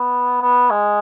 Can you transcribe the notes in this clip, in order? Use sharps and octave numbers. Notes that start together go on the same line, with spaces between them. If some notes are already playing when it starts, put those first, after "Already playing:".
Already playing: B3
B3
G#3